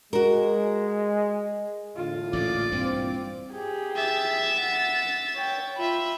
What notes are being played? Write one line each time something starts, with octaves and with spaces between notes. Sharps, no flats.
G#3 F#4 A#4
E2 A2 D3 F4
A1 A#2 D5
G2 A#2 E3 C4
G4 G#4
E5 A6
F#5
C#5 G5
F4 E5 B5